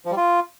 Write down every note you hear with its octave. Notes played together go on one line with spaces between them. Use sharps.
F3
G3
F4